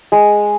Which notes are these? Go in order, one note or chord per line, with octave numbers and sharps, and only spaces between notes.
G#3